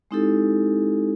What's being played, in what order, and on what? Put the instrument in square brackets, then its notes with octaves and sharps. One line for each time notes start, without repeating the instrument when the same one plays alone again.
[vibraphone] G#3 C4 D#4 E4 G4 A4